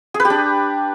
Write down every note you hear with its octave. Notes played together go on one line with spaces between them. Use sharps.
G#4
B4
G4
D4